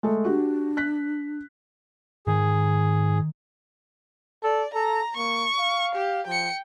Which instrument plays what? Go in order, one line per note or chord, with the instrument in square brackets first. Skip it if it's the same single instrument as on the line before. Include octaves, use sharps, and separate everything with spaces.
[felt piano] G#3 A3 A4
[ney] D4 [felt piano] F#4 G4
[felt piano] F#6 B6
[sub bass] G#2 [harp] D#3 [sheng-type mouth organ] G#4
[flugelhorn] A4 [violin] D5
[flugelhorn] A4 [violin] A#5
[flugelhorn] A#3 [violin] C#6
[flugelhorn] F5
[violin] G4
[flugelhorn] F3 [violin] G5 C#7